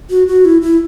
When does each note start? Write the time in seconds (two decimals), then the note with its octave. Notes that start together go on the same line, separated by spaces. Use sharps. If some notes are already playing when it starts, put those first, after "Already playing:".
0.10 F#4
0.27 F#4
0.45 E4
0.62 E4